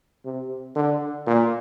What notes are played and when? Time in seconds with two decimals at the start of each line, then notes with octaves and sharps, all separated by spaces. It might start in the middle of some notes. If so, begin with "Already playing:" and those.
0.25 C3
0.76 D3
1.27 A#2